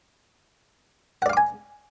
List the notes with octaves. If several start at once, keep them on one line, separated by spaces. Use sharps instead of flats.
D5 F5 F#5 G#5 D6